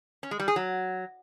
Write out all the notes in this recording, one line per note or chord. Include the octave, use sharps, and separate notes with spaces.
C#4
G#3
G3
G#4
F#3